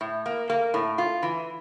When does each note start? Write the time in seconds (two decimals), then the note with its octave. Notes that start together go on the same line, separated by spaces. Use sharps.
0.01 A2
0.26 A#3
0.50 A#3
0.74 A2
0.98 F4
1.23 E3